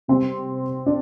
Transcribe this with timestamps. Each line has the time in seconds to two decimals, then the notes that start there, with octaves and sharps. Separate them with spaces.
0.08 C3 G3 C4
0.86 D4